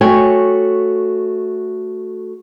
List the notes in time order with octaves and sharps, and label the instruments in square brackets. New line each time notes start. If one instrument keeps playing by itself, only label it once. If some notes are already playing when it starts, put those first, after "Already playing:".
[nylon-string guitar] A3 F#4 C#5 G5 G#5